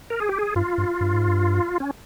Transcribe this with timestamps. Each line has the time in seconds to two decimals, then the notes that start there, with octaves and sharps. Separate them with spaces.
0.10 A#4
0.20 G#4
0.29 G4
0.39 G#4
0.56 G2 F4
0.78 G2
1.01 G2
1.14 G#2
1.27 G2
1.80 C#4